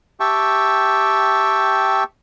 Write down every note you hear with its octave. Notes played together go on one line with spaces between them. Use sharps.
G4 E5 G5 A5 C#6